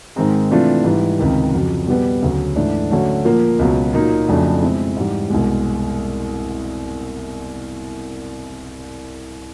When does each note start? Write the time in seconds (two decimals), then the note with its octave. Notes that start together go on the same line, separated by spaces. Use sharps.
0.16 G#2 D#3 G#3 C4 D#4
0.51 C3 E3 A3 D4 F4
0.84 G#2 E3 G3
1.19 C#2 C3 D#3
1.53 F2 C#3 F#3
1.87 B2 G3 B3
2.22 D2 C#3 F#3
2.56 G#2 E3 A3 D4
2.91 D3 F#3 A3 C#4
3.25 A#2 F3 A#3
3.59 C#2 B2 F#3
3.93 A#2 F#3 A#3 D#4
4.28 F2 C#3 F#3 A3 D4
4.62 B2 G#3 C4 E4
4.97 G#2 E3 G3
5.30 C2 B2 G#3